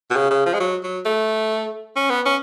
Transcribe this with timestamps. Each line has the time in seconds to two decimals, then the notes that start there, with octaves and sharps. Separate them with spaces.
0.10 B2
0.16 C#3
0.31 C#3
0.46 F3
0.54 G#3
0.60 F#3
0.83 F#3
1.05 A3
1.96 C#4
2.10 B3
2.26 C#4